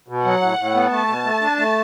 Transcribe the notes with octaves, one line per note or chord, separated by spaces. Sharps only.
B2
F#3 F#5
A2
A2
B3
A3 A5
B2
A3
D4
A3